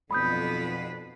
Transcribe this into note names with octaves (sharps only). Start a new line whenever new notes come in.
B1 F2 B2 D3 B4 B5 D#6 G6